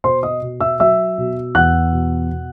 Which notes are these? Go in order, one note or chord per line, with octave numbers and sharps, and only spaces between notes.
B2 C5 C6
D#5 D#6
B2
E5 E6
F#3 E5 E6
B2
E2 F#5 F#6
B2
B2